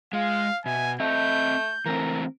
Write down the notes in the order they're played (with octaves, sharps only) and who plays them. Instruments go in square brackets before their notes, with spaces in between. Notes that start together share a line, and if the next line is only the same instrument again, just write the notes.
[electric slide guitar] G#3 [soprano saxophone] F4 [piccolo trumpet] F5
[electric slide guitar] B2 [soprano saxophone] E5 [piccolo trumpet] G#5
[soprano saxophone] A3 [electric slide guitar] C4 D#5 [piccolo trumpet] G6
[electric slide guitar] E3 A3 C4 [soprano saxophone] A#4